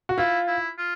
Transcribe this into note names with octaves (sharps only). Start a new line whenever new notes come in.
F#4
E4 F4
E4
F4